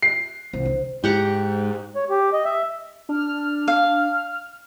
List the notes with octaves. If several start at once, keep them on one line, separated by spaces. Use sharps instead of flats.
C7
C2 C5
D3
G#2 G4 F#5 A#5
C#5
G4
D#5
E5
D4 F6
F5